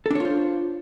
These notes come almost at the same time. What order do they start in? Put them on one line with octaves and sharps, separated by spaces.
A4 D4 C#5 F4 C5